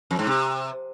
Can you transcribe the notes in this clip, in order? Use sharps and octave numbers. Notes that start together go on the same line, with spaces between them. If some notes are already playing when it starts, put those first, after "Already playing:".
F2
G#2
C3